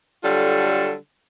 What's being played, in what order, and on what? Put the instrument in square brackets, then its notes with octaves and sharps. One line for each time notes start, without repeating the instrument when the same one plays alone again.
[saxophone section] D3 F#3 G3 F4 A4